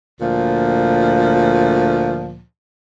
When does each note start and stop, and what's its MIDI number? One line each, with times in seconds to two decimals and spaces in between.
0.20 2.42 38
0.20 2.42 46
0.20 2.42 53